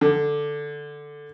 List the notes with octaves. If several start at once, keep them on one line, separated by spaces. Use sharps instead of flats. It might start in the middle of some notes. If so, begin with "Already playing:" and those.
D3